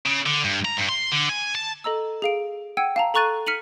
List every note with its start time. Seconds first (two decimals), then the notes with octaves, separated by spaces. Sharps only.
0.06 C#3
0.26 D3
0.44 G2
0.65 A#5
0.77 G2
0.89 C6
1.12 D3
1.29 G#5
1.55 A5
1.84 A4 D#5 A#5 E6
2.22 G#4 F5 D7
2.77 F#5 G5 E6 G#6 D#7
2.96 F5 A5 A#5
3.14 A4 A#5 C#6 F#6 A6 D#7
3.46 F6 B6 C#7 D#7 F7 F#7